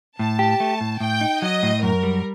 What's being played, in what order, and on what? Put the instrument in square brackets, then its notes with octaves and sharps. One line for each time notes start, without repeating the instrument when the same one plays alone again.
[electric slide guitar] A2 [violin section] A5
[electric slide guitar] G4
A3
A2
[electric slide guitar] A2 [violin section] G5
[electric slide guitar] D#4
[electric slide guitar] F#3 [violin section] D#5
[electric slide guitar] A2
[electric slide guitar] F#2 [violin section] A#4
[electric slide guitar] G3